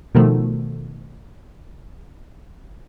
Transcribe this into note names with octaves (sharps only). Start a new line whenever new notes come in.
B2 D#3 F3 A3